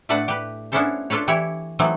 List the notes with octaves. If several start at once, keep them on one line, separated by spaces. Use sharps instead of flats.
A2 A3 D4 B4 F#5 A5
G4 B4
B3 C#4 D4 E4 A4 C5
D4 F4 A4 B4 C#5
E3 E4 G4 C#5
E3 F#3 A3 C4 D#4